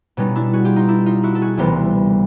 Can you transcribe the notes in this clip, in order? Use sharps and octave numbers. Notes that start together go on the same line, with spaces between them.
B2 G3 B3 C#4 D#4
D4 E4
F#4 G#4
F4 G4
D#4 F4
D4 E4
D#4 F4
E4 F#4
A4
F#4 G#4
D2 C3 E3 G3 B3 A#4 C5